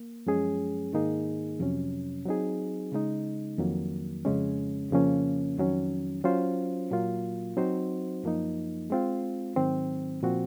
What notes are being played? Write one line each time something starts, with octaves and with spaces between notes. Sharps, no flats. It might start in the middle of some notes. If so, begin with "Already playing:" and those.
Already playing: A#3
F#2 F3 G#3 C#4 G#4
G#2 D#3 A#3 D#4 G#4
F2 C3 F#3 C#4
F#3 C4 D#4 G#4
C#3 G#3 D#4
F2 D#3 F#3 A#3
F2 C#3 G#3 C#4
F2 C#3 F3 A#3 C#4
F2 D#3 F#3 C#4
F#3 C#4 F4 C5
A#2 F#3 A#3 F4
F#3 C4 D#4 F#4 C5
F#2 F3 A#3 D#4
G#3 C4 F4
G#2 D#3 F#3 C4
A#2 F3 C4 F#4